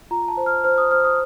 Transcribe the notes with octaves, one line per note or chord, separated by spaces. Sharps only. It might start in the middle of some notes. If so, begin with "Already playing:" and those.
F4 A#5
A5
C5
F6
C5 F6
D#6
C5 F6
D#6